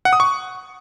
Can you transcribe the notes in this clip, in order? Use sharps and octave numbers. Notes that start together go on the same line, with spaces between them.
F#5
D#6
C#6